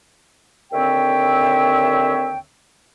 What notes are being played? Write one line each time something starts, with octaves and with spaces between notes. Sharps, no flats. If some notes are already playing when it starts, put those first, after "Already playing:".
D#2 D3 C4 C#5 E5 G5